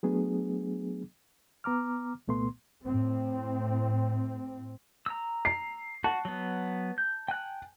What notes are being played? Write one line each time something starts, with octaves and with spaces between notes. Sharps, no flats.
F#3 A3 B3 D4 G#4
B3 A#5 D6 F6
C2 A#2 A3 B3 C6
A2 C4
A#5 E6
C7
F#4 A5
F#3 B3
G6
G5 G#5 F#6